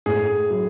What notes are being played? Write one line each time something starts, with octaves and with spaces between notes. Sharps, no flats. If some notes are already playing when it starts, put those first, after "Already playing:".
A2 G#4
F#3